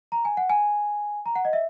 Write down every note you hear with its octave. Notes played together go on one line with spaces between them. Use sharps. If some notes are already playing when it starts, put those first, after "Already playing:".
A#5
G#5
F#5
G#5
A#5
F#5
D#5
E5